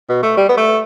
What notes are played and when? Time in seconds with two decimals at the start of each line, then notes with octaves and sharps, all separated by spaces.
0.09 B2
0.23 A3
0.37 G3
0.49 B3
0.57 A3